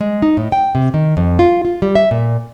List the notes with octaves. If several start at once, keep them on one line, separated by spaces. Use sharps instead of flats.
G#3
D#4
A2
G5
C3
D#3
F2
F4
F4
G3
E5
A#2